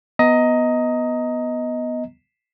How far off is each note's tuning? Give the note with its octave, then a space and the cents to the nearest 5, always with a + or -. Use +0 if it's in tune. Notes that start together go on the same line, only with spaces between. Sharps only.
B3 +0 D#5 +15 A#5 -15